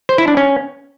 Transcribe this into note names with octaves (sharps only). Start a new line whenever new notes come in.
C5
E4
D4
C#4